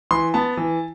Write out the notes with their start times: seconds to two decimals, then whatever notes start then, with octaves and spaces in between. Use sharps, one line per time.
0.11 E3 C6
0.34 B3 A5
0.57 E3